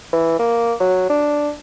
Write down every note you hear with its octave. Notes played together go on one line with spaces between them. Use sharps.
E3
A#3
F#3
D4